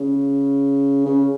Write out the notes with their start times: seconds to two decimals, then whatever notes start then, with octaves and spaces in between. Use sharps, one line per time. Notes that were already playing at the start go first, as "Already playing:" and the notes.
Already playing: C#3
1.05 C#3